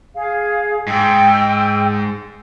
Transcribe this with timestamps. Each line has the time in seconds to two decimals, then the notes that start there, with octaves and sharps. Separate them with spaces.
0.15 G#4 F5
0.87 G#2 G5 E6